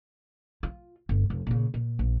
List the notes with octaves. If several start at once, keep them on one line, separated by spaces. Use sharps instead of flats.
F4
G1
F1
A#2 C#3
A#2
A#1